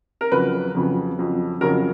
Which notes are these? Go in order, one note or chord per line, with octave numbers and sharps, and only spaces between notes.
A#4
F2 C#3 F#3 B4
F2 C#3 F#3
F2 C#3 F#3
F2 C#3 F#3 A#4